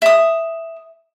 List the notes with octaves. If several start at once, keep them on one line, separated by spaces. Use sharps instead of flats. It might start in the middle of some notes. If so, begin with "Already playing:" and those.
E5 D#6